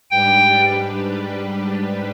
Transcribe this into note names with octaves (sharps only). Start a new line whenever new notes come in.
G#2 G3 D4 G4 B4 G5